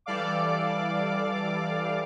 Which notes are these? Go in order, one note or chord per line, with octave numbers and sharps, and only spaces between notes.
E3 G3 A4 D5 F5 D6